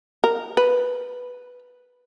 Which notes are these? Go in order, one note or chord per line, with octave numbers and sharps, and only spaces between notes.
A#4
B4